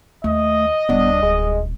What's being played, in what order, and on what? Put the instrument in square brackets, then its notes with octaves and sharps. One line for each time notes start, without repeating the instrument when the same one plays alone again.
[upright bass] D#2 [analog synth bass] A3 [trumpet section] D#5
[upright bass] D1 G3 [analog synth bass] B3 [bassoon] D4
[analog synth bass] D#1 [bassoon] G#3